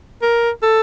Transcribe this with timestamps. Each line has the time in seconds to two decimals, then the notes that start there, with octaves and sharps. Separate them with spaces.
0.22 A#4
0.63 A4